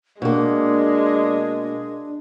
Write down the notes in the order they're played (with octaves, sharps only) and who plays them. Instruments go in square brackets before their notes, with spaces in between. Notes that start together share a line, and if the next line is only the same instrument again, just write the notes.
[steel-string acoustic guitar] B2 A#3 [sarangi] G#3 [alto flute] D4